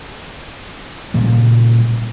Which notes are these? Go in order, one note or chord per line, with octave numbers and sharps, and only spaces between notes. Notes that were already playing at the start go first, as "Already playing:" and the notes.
A#2 C#3 G3